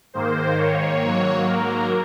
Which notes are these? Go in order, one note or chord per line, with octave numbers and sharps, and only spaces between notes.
G#2 D#3 A#3 C5
C#5
G#2 F#3 A#3
A#4